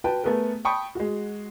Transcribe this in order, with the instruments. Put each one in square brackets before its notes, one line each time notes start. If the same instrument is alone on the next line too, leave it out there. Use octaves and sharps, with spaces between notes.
[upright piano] F#4 B4 G5 A5
A3 B3 G#4 A#4 B4
G5 A5 B5 C#6 D#6
G#3 F#4